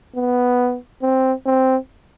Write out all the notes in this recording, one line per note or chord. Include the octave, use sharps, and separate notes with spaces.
B3
C4
C4